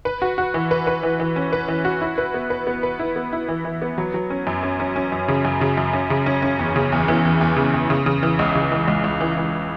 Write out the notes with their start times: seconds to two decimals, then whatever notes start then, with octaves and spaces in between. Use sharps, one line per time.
0.05 B4
0.22 F#4
0.38 F#4
0.54 E3
0.71 B4
0.87 B4
1.03 E3
1.20 E3
1.36 C#4
1.52 B4
1.68 E3
1.85 F#4
2.01 E4
2.18 B4
2.34 B3
2.50 B4
2.67 B3
2.83 B4
2.99 E4
3.16 B3
3.33 E4
3.48 E3
3.65 E3
3.82 B3
3.98 F#3
4.14 F#3
4.30 C#4
4.47 F#2
4.63 C#4
4.80 C#4
4.96 C#4
5.12 F#2
5.28 C#3
5.45 F#2
5.61 C#3
5.77 F#2
5.93 C#4
6.10 C#3
6.26 C#4
6.42 C#4
6.59 E2
6.76 C#3
6.92 E2
7.08 E3
7.25 E2
7.41 E2
7.57 C#3
7.74 E2
7.90 C#3
8.06 C#3
8.23 E3
8.39 C#2
8.55 C#3
8.72 E3
8.88 C#2
9.04 C#2
9.21 E3
9.37 E3